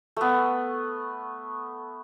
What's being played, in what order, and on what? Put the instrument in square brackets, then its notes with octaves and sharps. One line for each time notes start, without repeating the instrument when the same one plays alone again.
[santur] A3 B3